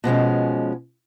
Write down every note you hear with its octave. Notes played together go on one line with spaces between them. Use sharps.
B2 F3 G#3 C#4